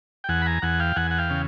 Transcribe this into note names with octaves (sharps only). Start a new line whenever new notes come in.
G5
E2 F#5 G#5
B5
G#5 A#5
E2 F#5 G#5
F5 G5
E2 F#5 G#5
F#5
F5 G5
C#3